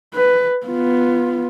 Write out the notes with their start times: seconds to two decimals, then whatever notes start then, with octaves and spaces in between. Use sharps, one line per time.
0.15 B4
0.66 B3 F4